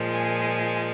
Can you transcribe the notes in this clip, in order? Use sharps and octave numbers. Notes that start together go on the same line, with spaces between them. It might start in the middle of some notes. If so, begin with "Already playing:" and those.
Already playing: A#2 F3 G#3
G#5